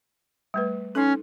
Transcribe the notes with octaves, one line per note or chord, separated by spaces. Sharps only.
G3 A3 B4
C#4 D#4 A4